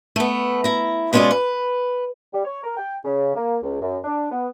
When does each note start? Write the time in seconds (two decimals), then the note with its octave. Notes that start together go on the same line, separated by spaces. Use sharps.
0.16 A3 B3
0.64 E4 A#5
1.13 B2 G#3 C#4 F4 C#5 D5
1.31 B4
2.33 G3
2.45 C#5
2.64 A#4
2.77 G5
3.04 C#3
3.35 A#3
3.62 C#2
3.81 F#2
4.04 D4
4.31 B3